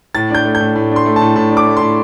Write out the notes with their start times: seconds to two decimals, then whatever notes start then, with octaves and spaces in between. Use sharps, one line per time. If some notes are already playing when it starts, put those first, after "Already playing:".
0.15 A2 A6
0.31 D4 G6
0.45 A3
0.55 G6
0.60 A2
0.76 A2
0.91 D4 C6
1.06 A3
1.16 A5
1.21 A2
1.36 A2 A5
1.51 D4
1.57 D6
1.67 A3
1.77 A2 C6